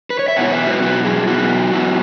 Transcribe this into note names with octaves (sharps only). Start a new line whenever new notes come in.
B4
C#5
E5
B2 F#3 B3 E4 C#5 F#5
B4 E5
F#4 B4
B2 F#3 B3 E4 F#4
G#4
B2 F#3 B3 E4 F#4
B2 F#3 B3 E4